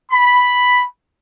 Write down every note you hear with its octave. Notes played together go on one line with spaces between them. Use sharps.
B5